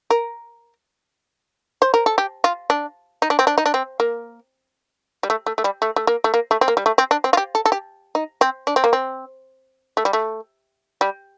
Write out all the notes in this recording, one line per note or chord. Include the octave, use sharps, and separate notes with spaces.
A#4
C5
A#4
A4
G4
F4
D4
D#4
D4
C4
D4
D#4
D4
C4
A#3
G3
A3
A3
A3
G3
A3
A3
A#3
A3
A#3
A3
C4
A#3
G3
A3
C4
D4
C4
F4
G4
A4
A4
G4
D#4
C4
D4
C4
A#3
C4
A3
G3
A3
G3